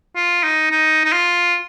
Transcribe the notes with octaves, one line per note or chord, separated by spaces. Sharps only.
F4
D#4
D#4
D#4
F4